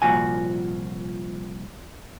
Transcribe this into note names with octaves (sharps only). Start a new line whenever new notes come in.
C2 A#2 F3 F#4 G#5